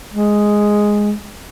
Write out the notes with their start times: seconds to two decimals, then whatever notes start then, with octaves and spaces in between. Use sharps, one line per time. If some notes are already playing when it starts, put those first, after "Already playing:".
0.14 G#3